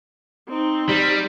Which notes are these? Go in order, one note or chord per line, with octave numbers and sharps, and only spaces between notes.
C4 D#4
G3